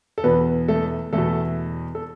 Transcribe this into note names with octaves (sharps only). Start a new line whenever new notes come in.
A4
E2 B2 B3 B4
A3 A4
E2 B2 A3 A4
A4